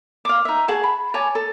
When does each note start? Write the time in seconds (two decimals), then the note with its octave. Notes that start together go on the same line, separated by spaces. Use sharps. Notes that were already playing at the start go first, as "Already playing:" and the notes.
0.25 F5 D6
0.45 D#4 E5
0.68 G#4 F#5 A5 C#6
0.84 B5
1.14 C#5 G#5 A5 D6
1.35 A4